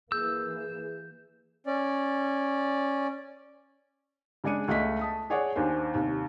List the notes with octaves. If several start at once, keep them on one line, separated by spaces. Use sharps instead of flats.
E3 A#3 G#4 E6 G6
C#4 D5
C#3 G#3 D4 D5 C#7 D#7
C#2 A3 D#5 B6
A5 D#6 B6
G#4 C#5 D5 F#5
D#2 D4 C5 G#5
D#2 C3